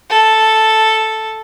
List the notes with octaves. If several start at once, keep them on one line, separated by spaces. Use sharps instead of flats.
A4